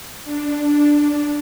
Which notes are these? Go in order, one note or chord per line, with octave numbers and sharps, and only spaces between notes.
D4